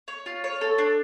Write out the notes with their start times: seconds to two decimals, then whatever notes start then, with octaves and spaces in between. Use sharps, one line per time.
0.08 C#5
0.26 F4
0.44 C#5
0.61 A4
0.78 D4